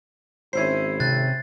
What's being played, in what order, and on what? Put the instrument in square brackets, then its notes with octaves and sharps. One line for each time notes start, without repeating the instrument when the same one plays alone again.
[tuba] G#1 [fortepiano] C#4 E4 C5 [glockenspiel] G#6 C7
[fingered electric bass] C3 [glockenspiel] F#6 A6